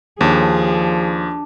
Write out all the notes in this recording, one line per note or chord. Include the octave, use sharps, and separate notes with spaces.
D#2 F3 D4 G#4